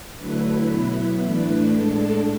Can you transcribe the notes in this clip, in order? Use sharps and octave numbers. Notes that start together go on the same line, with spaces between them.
D3 F#3 A3 E4 B4
B2 F#3 B3 E4
A2 E3 A3 D4 B4
A2 G#3 D4 A4